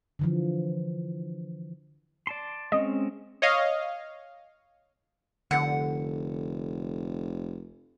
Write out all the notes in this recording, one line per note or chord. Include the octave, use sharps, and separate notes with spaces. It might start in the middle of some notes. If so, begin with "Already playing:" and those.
D3 E3 F3
D5 A5 C6
G#3 C4 C#4 D#5
C#5 D#5 F5
F1 D3 F#5